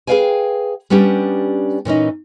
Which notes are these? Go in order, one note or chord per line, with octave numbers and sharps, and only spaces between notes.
G#4 B4 C#5 F5 G5 G#5
G3 B3 C#4 D4 G4
A#2 E3 C#4 D#4